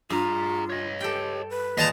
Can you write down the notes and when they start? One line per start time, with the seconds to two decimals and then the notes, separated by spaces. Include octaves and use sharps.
0.10 G2 F4 G#4 A#5
0.70 C#5 D#5
1.01 G4 A4 G5
1.50 B4
1.78 A#2 G#3 D#5 A5 A#5